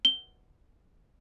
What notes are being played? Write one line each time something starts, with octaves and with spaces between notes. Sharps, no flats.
G7